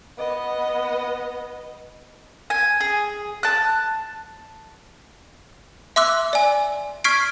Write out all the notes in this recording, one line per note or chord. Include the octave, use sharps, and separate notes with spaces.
B3 D#5
G#5
G#4
A5 F#6
E5 C6 D6 E6 F#6
D5 G#5
C#6 F6 G#6 B6 C7 D7